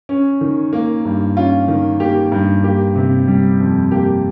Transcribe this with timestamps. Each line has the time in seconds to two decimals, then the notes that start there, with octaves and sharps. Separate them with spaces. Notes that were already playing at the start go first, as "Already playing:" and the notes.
0.09 C#4
0.41 D#3
0.73 A#3
1.05 G2
1.36 C#4 F4
1.68 D#3
2.00 A#3 G4
2.32 G2
2.64 A#3 G4
2.95 C3
3.28 G3
3.60 F2
3.91 A#3 G4